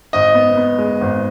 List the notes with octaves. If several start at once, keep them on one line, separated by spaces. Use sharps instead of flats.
G#1 D#5
B3
B3
G#3
G#1